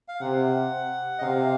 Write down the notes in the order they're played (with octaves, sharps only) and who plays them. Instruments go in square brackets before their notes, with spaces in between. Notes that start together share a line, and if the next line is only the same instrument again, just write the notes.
[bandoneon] F5
[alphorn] C3 [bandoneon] F#5
[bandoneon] D#5
[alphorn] C3 [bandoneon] F5